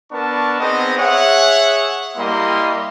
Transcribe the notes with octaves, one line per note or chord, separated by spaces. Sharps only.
B3 D4 A#4 A5 C#6
B3 C4 D#4 G#4 D#5
G#4 C#5 E5 F#5
G3 A#3 E4 D#5 C6